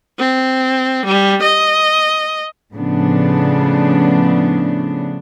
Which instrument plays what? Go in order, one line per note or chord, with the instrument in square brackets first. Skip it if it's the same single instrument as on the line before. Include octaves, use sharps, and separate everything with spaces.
[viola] C4
G3
D#5
[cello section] A2 C#3 F3 B3 D4